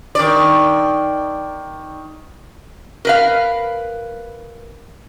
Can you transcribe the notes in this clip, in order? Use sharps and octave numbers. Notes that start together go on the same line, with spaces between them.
D#3 D5
A#4 B4 F5